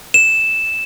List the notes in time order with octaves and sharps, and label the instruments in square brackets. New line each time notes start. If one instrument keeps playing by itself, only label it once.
[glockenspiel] E7